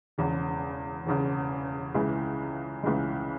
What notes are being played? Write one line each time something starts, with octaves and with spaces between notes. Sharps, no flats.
E1 E2 C#3
E1 E2 C#3
C#2 C#3 E3 G#3
C#2 C#3 E3 G#3